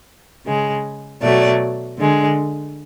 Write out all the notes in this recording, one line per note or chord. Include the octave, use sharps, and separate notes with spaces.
C#3 G#3
B2 F#3 A3 D5
D3 G#3